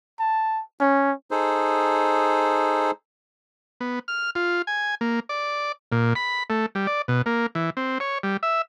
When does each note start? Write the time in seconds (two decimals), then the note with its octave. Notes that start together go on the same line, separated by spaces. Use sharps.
0.19 A5
0.81 C#4
1.31 D#4 G#4 A4 C5
3.81 B3
4.08 F6
4.35 F4
4.67 G#5
5.01 A#3
5.29 D5
5.92 A#2
6.15 B5
6.50 A3
6.75 G3
6.87 D5
7.08 B2
7.26 A#3
7.55 E3
7.77 C4
8.00 C#5
8.23 G3
8.43 E5